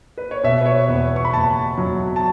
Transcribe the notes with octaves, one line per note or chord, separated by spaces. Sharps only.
B4
C#5
B2 E5
B4
C#5
E2 B4
C#6
B5
F#1 A5
F#3
A5